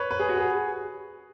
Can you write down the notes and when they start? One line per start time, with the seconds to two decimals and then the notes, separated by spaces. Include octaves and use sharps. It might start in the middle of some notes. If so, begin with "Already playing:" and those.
Already playing: B4 C#5
0.11 B4
0.20 G#4
0.29 F#4
0.38 G#4